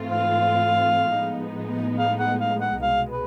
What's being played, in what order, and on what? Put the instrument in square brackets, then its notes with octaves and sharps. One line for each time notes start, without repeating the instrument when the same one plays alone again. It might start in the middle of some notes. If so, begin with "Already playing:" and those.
Already playing: [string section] G#2 E3 A3 C4 F4
[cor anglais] F5
[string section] A2 F3 G#3 B3 D#4
[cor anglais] F5
F#5
F5
F#5
[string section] C2 B2 G#3 [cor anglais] F5
[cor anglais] B4